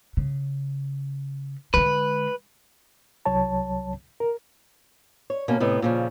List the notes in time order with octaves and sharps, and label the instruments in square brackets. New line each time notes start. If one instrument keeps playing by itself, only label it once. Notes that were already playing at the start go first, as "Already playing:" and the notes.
[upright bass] C#3
[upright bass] D3 G#3 [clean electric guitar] B4
[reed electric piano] C2 F#3 C#5 A5
A#4
[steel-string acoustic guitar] C#5
B2 A#3 C#4
A2 C3 B3 D#5
A#2 C#3 F3